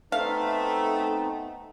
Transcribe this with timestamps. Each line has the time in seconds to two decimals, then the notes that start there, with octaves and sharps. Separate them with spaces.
0.12 A3 B3 C4 D#4 E5 F5